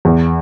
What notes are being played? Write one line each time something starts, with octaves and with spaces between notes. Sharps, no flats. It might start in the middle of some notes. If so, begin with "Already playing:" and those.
E2